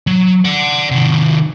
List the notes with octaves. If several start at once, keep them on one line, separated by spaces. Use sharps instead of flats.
F#3
D5 F#5
C3 D#3